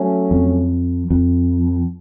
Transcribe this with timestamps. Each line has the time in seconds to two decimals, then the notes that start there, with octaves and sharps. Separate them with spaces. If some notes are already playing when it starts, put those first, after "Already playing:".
Already playing: F#3 A3 C#4
0.31 F2
1.11 F2